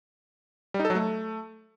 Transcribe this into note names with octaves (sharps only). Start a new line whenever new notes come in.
G3
D#4
A4
F#3
A3